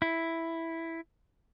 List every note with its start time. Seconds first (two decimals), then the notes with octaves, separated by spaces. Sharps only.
0.02 E4